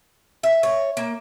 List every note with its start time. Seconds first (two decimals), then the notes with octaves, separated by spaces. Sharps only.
0.43 E5
0.63 C#5
0.97 A#3